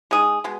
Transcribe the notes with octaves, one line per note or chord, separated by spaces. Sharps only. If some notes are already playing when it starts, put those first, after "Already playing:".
G#3 D#4 G#4
B2 G#3